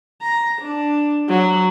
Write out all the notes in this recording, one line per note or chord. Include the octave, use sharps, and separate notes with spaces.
A#5
D4
F#3